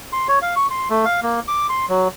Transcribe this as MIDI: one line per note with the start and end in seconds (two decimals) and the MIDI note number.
0.13 0.27 84
0.28 0.39 73
0.42 0.55 77
0.56 0.67 85
0.70 0.88 84
0.90 1.05 57
1.05 1.20 77
1.22 1.40 58
1.48 1.67 86
1.69 1.86 84
1.89 2.08 54